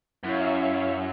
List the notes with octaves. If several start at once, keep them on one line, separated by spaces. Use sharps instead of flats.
F#2 E4 C#5 E5 F5